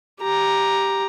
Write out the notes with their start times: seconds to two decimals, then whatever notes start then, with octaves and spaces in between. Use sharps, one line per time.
0.21 G4 A#5